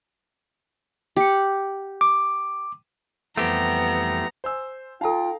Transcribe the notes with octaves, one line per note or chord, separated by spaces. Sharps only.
G4 F#5
D6
F2 E3 G3 A3 B3 C4 G4 A#5
C5 G#5 E6
D#4 F4 A4 F5 G5 A#5